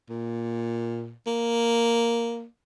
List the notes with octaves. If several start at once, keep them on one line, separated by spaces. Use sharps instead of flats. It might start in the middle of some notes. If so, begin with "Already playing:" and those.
A#2
A#3